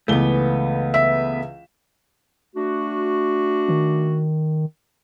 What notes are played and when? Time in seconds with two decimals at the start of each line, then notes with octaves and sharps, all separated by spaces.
0.08 C#2 E3 A3 B3 G7
0.94 E5
2.55 A3 D4 F#4
3.69 D#3